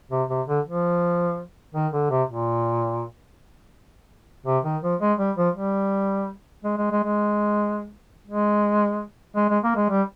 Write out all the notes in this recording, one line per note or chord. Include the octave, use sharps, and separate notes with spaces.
C3
C3
D3
F3
D#3
D3
C3
A#2
C3
D#3
F3
G#3
G3
F3
G3
G#3
G#3
G#3
G#3
G#3
G#3
G#3
A#3
G#3
G3